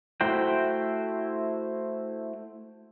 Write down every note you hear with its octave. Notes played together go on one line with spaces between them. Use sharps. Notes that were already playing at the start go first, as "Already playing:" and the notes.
A3 E4 F#4 C5 G5